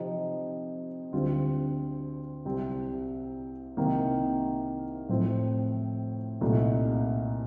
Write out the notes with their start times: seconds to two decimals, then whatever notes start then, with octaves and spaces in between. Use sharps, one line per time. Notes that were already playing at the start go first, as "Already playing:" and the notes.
Already playing: C3 F3 C4 D#4 G4
1.13 D2 D3 G3 C4 F4
2.45 C2 C3 G3 C4
3.77 C2 C3 D#3 A#3
5.09 A2 F3 C4
6.41 C2 A#2 A3 D#4